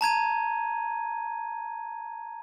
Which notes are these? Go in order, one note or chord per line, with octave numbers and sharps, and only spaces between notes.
A5 A#5 G#6 D#7